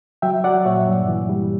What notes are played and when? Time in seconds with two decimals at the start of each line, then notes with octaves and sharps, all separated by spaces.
0.22 F#3 E5 G5
0.44 F#3 D5 F#5
0.65 A#2 C#5 E5
0.87 G2
1.08 E3
1.29 G3